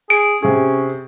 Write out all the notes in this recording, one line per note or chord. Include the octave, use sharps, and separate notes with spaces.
G#4 D7
C3 C#4 G#4